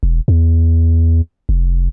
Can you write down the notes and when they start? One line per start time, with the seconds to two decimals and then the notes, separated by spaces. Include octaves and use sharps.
0.03 E1
0.28 E2
1.49 F1